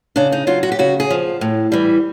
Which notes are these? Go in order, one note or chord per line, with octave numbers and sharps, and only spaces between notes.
C#3 D4
D#4
F#3 F4
F#4
G4
C#3 F#4
G#4
F3
A2
E3 G3